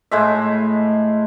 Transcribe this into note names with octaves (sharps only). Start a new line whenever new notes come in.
A2 G#3 E5